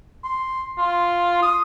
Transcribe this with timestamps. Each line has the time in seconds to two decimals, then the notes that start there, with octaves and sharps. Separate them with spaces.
0.24 C6
0.78 F4
1.42 D#6